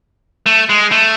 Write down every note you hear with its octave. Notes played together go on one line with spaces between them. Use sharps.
A3
G#3
A3